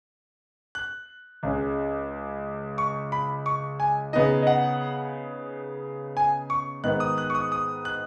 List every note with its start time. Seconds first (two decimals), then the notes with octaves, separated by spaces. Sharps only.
0.75 F#6
1.43 C#2 C#3 G#3 C#4
2.78 C#6
3.12 B5
3.46 C#6
3.80 G#5
4.13 C#3 B3 D#4 D#5
4.42 D#5
4.47 F#5
6.17 G#5
6.50 C#6
6.84 G#2 D#3 B3 D#4 F#6
7.00 D#6
7.18 F#6
7.30 C#6
7.35 D#6
7.52 D#6
7.85 F#6